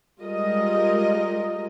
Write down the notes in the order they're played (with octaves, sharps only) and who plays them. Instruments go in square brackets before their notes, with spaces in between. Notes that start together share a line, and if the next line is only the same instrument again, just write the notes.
[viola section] G3 G#3 F4 A#4 D#5